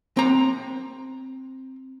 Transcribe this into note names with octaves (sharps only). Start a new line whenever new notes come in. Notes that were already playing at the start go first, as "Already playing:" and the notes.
C4 A#5